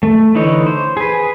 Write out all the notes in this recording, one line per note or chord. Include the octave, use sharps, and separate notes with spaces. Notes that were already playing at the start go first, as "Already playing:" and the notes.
A3
D3 E3 D#4 C#5
C5
G#4 B4